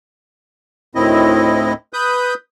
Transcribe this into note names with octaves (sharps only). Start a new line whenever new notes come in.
D2 A2 D#3 C4 E4 D#5
B4 B5 D#6 G6